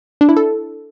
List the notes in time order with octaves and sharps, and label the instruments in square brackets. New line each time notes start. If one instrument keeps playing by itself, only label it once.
[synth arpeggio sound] D4
E4
A4